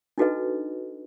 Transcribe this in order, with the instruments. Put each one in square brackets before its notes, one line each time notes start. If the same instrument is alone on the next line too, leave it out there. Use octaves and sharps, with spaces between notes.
[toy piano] D4 D#4 F#4 A4 B4 D#5